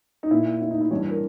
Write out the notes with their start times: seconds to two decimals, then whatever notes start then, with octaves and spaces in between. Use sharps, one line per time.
0.23 D#4
0.31 A#2 E4
0.61 E4
0.71 D#4
0.81 E4
0.91 G2 E3 C#5
1.11 A#4